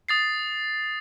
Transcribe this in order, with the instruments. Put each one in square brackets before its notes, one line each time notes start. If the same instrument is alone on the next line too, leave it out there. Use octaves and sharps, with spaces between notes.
[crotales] D#6 A6 C7